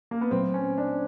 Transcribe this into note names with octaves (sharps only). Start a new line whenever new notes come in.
A#3
B3
A#2 F#3 A3 C4
C#4
D4